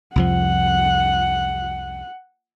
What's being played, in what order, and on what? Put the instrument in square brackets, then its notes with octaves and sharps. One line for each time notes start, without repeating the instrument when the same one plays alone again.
[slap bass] C2 F2 F3 [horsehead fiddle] F#5